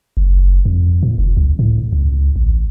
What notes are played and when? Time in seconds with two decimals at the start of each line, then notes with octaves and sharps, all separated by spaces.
0.17 F#1
0.65 F2
1.03 A#2
1.18 F1
1.37 C#2
1.59 A2
1.93 C#2
2.36 A1